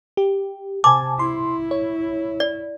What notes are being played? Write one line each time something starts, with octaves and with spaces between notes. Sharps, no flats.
G4
C3 G#5 A5 D6
E4 C6
C#5
D5